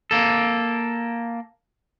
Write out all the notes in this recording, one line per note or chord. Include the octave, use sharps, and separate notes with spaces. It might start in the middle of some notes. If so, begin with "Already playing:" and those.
A#3 A4